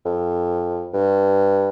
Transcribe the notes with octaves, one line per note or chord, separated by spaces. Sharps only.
F2
G2